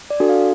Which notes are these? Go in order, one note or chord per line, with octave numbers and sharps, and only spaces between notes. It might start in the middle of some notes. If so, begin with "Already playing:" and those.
D5
D4 F#4 A4
F5